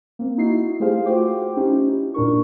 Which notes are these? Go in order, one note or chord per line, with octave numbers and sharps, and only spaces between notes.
A#3 C4
D#4 E4 F#4 C7
A3 G4 G#4 C5 F5
F4 F#4 C5 G5 D6
C#4 D#4 E4 G4
A#2 D4 A#4 C#6